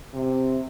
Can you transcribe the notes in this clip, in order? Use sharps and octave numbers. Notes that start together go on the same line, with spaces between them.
C3